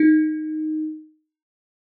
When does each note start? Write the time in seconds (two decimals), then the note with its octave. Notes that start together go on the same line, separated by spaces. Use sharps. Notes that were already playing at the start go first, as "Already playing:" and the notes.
Already playing: D#4